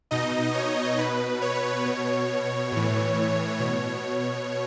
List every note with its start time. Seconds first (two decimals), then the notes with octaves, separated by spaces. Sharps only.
0.11 B2 D#4 D#5
0.54 C#5
0.98 B2 B4
1.42 C#5
1.86 B2
2.72 A2 E3
3.59 B2 C#5